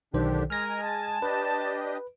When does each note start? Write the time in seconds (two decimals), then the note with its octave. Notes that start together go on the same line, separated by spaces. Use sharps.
0.14 B1 D3 D#3 D4 G4 C5
0.50 G#3 A#4 G#5 F6 A#6
0.82 A5
1.22 D4 G4 B4 D#5